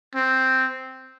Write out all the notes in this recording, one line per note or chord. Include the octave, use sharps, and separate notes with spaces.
C4